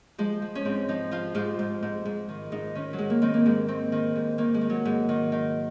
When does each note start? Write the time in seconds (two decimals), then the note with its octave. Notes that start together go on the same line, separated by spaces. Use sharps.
0.18 F3 G#3
0.42 F3
0.55 C#4
0.65 G#2 C4
0.88 F3 D#4
1.11 F3 F4
1.35 G#2 F4
1.59 G#2
1.82 G#2
2.05 G#2
2.29 D#3
2.52 G#2 D#4
2.75 D#3 C#4
2.93 F#3
2.98 G#2 G#3
3.10 A#3
3.22 D#3 C4
3.34 A#3
3.46 G#2 G#3
3.68 D#3 C4
3.92 D#3
4.16 G#2
4.38 D#3 A#3
4.54 G#3
4.61 D#3
4.70 F#3
4.85 G#2
5.09 D#3
5.32 D#3